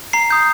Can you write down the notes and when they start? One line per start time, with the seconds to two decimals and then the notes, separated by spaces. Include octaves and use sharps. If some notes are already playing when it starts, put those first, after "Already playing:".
0.13 A#5 C7
0.30 D#6 G6